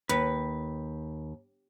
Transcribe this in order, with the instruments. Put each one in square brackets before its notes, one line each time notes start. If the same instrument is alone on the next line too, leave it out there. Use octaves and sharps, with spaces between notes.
[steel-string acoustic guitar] D#2 [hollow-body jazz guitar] B4